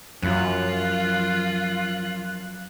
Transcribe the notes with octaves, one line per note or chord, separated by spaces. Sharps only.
F#2 F3 F#3 F4 F#6